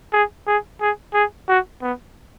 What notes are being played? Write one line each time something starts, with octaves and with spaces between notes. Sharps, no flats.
G#4
G#4
G#4
G#4
F#4
B3